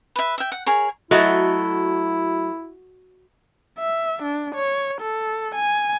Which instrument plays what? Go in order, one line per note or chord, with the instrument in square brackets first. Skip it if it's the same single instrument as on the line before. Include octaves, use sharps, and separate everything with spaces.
[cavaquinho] B4 E5
E5 G5
F#5
G#4 A#4 C#5
[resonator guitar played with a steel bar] F#3 A3 D#5 [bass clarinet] E4 [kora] F#4
[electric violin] E5
D4
C#5
A4
G#5